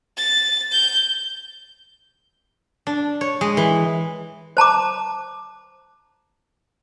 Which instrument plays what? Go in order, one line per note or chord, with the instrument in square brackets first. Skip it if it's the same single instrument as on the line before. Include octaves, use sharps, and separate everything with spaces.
[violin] A6
G6
[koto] D4
C#5
G#3
E3
[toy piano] C5 A5 A#5 D6